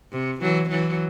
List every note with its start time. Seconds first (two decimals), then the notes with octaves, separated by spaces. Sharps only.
0.12 C3
0.42 E3 F#3
0.70 E3 F#3